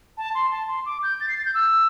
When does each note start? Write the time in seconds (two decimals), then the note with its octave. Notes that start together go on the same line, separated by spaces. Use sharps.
0.18 A5
0.35 C6
0.51 A5
0.68 C6
0.86 D6
1.03 G6
1.20 A6
1.29 C7
1.38 A6
1.45 G6
1.54 E6